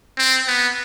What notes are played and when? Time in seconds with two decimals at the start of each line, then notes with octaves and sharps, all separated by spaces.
0.17 C4
0.47 B3